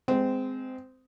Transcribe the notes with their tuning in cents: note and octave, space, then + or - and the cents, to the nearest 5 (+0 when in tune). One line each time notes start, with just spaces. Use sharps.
G#3 +0 C4 -20